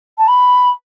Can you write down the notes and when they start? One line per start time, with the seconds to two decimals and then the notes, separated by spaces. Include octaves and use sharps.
0.18 A5
0.28 B5